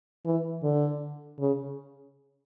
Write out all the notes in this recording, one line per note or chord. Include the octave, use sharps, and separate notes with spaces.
E3
D3
C#3